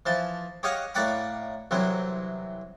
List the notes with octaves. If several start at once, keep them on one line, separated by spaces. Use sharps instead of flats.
E3 F3 A5
G4 C#5 D#5 F5 F#5
A2 A#3 D5 F#5 G5 B5
C2 E3 F#3 C4